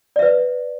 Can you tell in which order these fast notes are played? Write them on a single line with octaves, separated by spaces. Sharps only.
D5 E5 B4